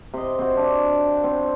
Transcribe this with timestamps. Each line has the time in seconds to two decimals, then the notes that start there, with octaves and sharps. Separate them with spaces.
0.14 C3 D#5
0.39 C4 F#4
0.57 D4
1.24 C4